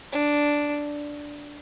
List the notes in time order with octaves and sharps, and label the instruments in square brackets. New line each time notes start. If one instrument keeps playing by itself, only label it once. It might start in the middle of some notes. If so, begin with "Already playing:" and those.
[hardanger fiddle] D4